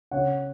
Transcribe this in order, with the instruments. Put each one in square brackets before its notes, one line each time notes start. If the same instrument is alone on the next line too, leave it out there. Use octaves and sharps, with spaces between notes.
[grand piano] C#3 C#5 F#5